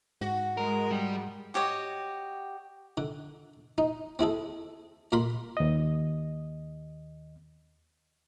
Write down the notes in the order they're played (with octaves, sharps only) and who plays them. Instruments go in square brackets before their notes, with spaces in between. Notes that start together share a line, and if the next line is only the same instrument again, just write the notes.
[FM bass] G#2 [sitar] F#4
[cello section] G#3 [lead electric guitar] A#4
[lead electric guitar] G3
[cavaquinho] F#4 G4 C#5 D#5
[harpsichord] D3
D#4
C4 E4 G#4 A4
A#2 A#4 B5 C6
[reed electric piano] D#2 D#5